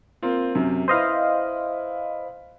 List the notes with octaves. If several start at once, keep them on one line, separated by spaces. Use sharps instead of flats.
A#3 C4 F4
F#2 C3
E4 B4 C5 D#5 F5